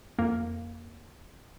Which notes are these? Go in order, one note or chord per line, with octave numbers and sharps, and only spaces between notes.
F2 A#3